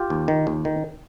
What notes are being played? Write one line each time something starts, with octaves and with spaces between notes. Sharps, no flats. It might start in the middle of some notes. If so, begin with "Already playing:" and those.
Already playing: F4 G4
D#2
D#3
D#2
D#3